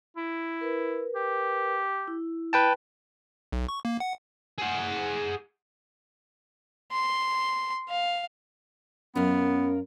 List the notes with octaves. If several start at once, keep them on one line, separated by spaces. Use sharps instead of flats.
E4
A#4 B4
G4
E4
B4 G5 A5
B1
C#6
A#3
F#5
G#4 F#5
C6
F5
F#2 B3 C#4 F4 A#4